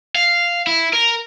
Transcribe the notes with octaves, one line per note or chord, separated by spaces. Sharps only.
F5
E4
A#4